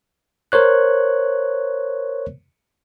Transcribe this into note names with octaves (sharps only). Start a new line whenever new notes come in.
A#4 C5 C#5 F#6